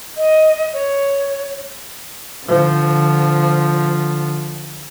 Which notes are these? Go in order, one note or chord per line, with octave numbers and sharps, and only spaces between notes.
D#5
C#5
D3 F3